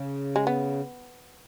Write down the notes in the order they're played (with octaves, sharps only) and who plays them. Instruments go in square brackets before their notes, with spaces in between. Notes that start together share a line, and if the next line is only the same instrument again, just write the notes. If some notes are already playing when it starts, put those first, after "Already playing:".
Already playing: [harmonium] C#3
[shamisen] G#3
B3